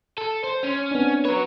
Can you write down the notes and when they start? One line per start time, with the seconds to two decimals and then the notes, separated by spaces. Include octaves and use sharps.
0.18 A4
0.44 C5
0.63 C#4
0.91 B3 C4 D4
1.25 F#3 B4 C#5 A#5